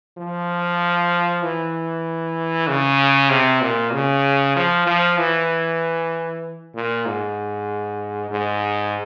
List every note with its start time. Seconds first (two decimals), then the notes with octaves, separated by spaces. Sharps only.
0.18 F3
1.43 E3
2.68 C#3
3.30 C3
3.61 A#2
3.93 C#3
4.56 F3
4.87 F3
5.18 E3
6.75 A#2
7.06 G#2
8.30 G#2